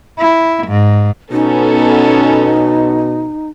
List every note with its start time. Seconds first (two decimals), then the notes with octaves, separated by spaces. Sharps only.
0.18 E4
0.67 G#2
1.32 B2 B3 C#4 D#4 A4